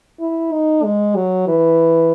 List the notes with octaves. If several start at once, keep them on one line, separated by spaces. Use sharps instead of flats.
E4
D#4
G#3
F#3
E3